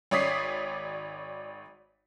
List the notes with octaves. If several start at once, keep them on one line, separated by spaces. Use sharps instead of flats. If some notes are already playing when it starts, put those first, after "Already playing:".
G#1 C#5 D5 D#6 B6 C7